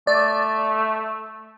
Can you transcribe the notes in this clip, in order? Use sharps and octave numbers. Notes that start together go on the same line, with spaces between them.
A3 D5